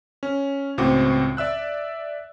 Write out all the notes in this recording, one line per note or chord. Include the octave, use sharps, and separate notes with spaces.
C#4
C#2 A2 C4 F#4 D6
D5 E5 E6 F#6